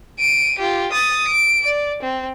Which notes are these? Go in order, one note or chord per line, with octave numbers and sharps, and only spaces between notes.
D7 D#7
F4 G4
D#6 A6
D7
D5
C4